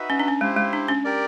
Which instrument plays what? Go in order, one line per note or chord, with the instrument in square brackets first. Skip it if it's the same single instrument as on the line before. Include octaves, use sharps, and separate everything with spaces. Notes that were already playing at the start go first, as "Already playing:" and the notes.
Already playing: [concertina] D#4 F#4 B4 E5
[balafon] C#4
D4
C#4
[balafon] G#3 [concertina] E4 G4 C5
[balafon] G#3
D4
C#4
[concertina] G4 A#4 D5